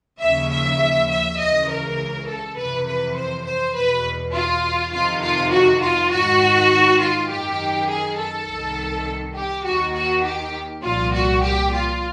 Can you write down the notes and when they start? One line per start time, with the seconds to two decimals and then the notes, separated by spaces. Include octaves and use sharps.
0.20 D#2 C#3 F3 E5
0.50 E5
1.09 E5
1.38 C#2 C#3 E3 D#5
1.68 A#4
2.27 A4
2.57 F2 C3 E3 B4
2.86 B4
3.16 C5
3.45 C5
3.75 E2 B2 B4
4.34 F4
4.92 F2 C3 D#3 F4
5.22 F4
5.52 F#4
5.81 F4
6.11 G#2 D#3 F#4
7.00 F4
7.29 F#2 D#3 G4
7.88 G#4
8.18 A4
8.46 C2 C3 D#3
9.35 G4
9.65 D#2 D#3 F#4
9.95 F#4
10.24 G4
10.83 C2 A#2 F3 F4
11.13 F#4
11.42 G4
11.72 F4